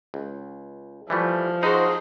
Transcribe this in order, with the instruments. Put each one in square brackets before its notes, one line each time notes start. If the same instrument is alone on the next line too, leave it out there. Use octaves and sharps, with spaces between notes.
[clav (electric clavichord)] C#2
[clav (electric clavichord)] E3 G3 A3 [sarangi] F3
[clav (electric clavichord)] D#4 F#4 [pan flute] G#4 [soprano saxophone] C5